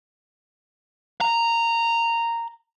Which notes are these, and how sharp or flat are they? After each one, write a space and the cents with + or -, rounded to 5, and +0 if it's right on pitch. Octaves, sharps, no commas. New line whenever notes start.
A#5 -10